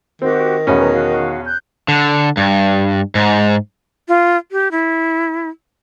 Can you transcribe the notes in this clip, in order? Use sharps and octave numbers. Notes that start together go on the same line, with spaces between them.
D#3 C4 F#4 G4
E2 B2 C#4 E5 F#5
B4 A#5
F#4 F5
F#6 G6
D3
G2
G#2
F4
G4
E4